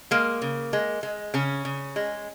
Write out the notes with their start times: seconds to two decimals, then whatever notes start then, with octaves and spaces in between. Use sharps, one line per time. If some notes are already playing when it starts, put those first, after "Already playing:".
0.11 G#3 A#3
0.42 C#3
0.73 G#3
1.03 G#3
1.34 C#3 C#4
1.65 C#3
1.96 G#3